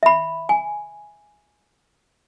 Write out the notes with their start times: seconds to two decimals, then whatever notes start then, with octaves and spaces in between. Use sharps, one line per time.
0.03 E5 B5
0.49 G#5